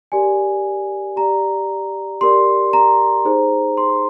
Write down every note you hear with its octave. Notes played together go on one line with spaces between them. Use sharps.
G4 A#4 D5 G#5
G4 D5 A#5
G4 A#4 D5 C6
A#5
D#4 G#4 C5
C6